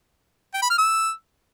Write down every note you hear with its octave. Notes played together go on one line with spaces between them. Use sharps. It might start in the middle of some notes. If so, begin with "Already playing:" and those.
G5
B5
F6
E6